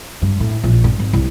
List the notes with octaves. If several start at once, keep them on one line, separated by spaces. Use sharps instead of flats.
G2
A2
A#1
G2
G#1
C2